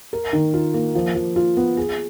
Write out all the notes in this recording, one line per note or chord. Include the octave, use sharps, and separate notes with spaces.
A#4
D#3
F4
A#3
F3
F3
F4
B3
G#4